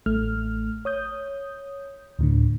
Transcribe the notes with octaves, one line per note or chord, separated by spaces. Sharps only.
A1 A3 F6
C#5 D#6 G6
D2 A2 D3